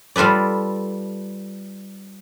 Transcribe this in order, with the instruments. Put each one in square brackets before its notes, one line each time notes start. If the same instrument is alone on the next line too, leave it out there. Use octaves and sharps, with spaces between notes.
[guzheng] G3 F4 A4 B4 D5